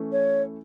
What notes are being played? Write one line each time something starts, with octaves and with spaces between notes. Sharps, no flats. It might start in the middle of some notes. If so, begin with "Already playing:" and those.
Already playing: E3 A3 C#4 E4
C#5